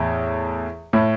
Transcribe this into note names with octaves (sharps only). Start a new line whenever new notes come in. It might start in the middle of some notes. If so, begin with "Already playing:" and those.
Already playing: E2 A2
A2